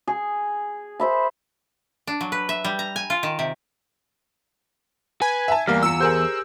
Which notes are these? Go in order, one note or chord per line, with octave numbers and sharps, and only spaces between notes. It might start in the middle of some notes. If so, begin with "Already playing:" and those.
G#4
C5 E5 B5
D4
F#3
B4
E5
G3
A#5
G#5
F4
D#3
C3
B4 G#5
E5 A5
E2 G3 A#3 F6
F4 A#5 E6 C#7
G4 G#4 A#4 C5 G6